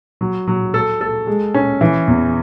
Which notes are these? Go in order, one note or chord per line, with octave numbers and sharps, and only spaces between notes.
F#3
F#3
A4
A4
G#3
C#4
E3
E2